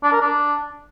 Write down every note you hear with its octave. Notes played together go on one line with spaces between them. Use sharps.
D4
A#4
D4